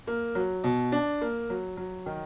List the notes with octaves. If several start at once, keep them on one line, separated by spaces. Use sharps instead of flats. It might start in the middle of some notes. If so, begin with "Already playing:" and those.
A#3
F#3
B2
D4
A#3
F#3
F#3
D#3